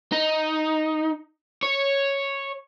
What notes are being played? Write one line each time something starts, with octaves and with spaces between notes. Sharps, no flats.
D#4
C#5